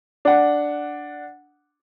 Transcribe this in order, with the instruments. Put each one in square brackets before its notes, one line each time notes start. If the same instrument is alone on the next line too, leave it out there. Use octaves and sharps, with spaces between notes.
[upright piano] D4 F#5